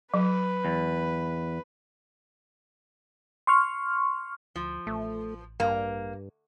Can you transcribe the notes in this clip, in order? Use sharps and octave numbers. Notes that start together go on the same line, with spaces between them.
F#3 B4
E2
C6 C#6 F6
D2 F3
A1 A3
G2 A#3